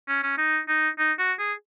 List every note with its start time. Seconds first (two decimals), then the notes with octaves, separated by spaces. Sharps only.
0.08 C#4
0.23 C#4
0.38 D#4
0.68 D#4
0.99 D#4
1.19 F#4
1.39 G#4